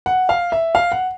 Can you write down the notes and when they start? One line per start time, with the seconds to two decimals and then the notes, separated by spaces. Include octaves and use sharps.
0.06 F#5
0.29 F5
0.52 E5
0.75 F5
0.92 F#5